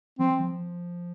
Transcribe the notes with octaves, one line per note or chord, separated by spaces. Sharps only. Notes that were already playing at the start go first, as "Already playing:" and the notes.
F3 C4
F3